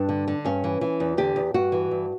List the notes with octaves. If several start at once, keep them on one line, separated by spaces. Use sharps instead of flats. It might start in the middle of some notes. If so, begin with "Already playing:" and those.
Already playing: G2 D4
D3
D3
G2 C#4
E3
E3
E2
D3 G4
E2
G2 F#4
E3
G2